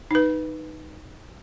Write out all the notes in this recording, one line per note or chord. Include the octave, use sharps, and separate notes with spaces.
D#4 B4